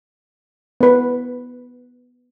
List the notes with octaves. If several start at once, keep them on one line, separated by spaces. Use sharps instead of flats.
B3 B4